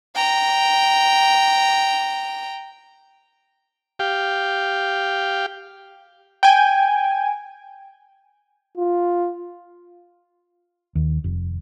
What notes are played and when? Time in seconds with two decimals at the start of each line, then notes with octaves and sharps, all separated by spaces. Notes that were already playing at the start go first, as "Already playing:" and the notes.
0.15 G5 A#5
3.99 G4 F5 G5
6.43 G5 G#5
8.78 F4
10.95 D#2
11.24 F1